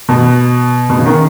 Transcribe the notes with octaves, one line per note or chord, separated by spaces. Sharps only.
B2
B2
C#3
D#3